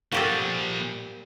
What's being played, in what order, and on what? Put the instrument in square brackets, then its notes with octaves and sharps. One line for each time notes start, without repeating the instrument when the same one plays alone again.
[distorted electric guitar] A#2 F3 [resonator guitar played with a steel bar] G3 A#3 C4 [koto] F#4 G4 A4